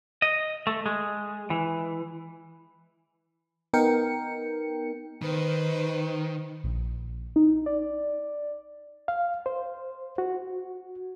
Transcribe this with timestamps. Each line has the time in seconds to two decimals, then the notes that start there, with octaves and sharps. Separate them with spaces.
0.22 D#5
0.67 A3
0.86 G#3
1.50 E3
3.73 B3 D#4 A#4 G5 C#7
5.22 D#3 B4 C5
6.64 A#1
7.36 D#4
7.66 D5
9.08 F5
9.46 C5
10.18 F#4